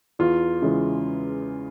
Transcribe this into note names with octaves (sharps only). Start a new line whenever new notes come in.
E2 F4
C#3 E3 G#3